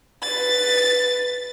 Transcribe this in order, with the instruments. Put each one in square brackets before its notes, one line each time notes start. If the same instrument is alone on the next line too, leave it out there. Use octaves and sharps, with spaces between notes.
[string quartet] B4 A6